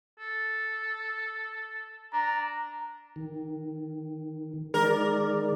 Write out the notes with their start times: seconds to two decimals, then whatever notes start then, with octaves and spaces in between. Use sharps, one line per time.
0.20 A4
2.13 D4 A#5
3.16 D#3
4.74 D#3 G#3 A#4 D5